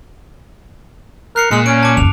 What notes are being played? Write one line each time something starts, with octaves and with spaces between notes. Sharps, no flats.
A#4 F#6 C7 C#7
A#2 G#3 F6 C#7
C#4 D7
A5 D6
F#1 D#2 F7